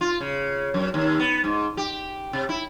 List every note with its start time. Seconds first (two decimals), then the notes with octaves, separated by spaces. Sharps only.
0.01 F4
0.20 C#3
0.74 F#2
0.94 D#2
1.19 B3
1.44 G#2
1.77 G4
2.33 C3
2.49 E4